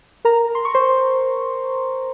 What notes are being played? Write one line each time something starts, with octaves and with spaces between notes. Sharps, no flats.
A#4 A#5
C6
C#6
C5 C6